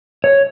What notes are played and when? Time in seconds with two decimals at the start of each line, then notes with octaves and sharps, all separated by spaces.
0.24 C#5